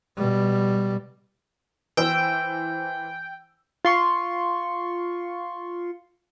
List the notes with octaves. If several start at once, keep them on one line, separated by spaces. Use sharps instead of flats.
B2 G3
E3 C5 G5 E6
F4 C6 C#6